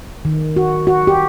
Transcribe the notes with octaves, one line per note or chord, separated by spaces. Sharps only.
D#3
F#4
F#4
G4